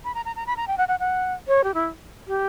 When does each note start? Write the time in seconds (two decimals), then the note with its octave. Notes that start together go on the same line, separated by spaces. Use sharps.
0.04 B5
0.15 A#5
0.25 A#5
0.36 A#5
0.47 B5
0.57 A#5
0.68 G5
0.78 F#5
0.88 F#5
1.00 F#5
1.48 C#5
1.64 G4
1.74 E4
2.28 G4